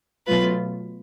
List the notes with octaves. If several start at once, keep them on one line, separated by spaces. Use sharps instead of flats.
B2 F#3 A3 F4 B4